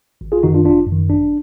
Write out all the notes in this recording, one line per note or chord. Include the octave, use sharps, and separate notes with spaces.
G#1
F4 G#4
F#2 D#3 D#4 F#4
D4 F4
G#1 D4 F4
F#2 D#3
G#1 D4